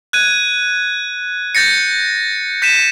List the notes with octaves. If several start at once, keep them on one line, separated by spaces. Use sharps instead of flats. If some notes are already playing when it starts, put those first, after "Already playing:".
F#6 G#6 D#7
G6 A6 A#6 C#7
G6 B6 D#7 E7